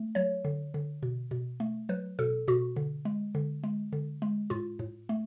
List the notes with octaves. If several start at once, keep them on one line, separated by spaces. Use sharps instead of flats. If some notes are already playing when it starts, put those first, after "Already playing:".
Already playing: A3
F#3 C#5
D3
D3
B2
B2
A3
F#3 B4
B2 A4
B2 F#4
D3
G#3
D3
G#3
D3
G#3
A2 F4
A2
A3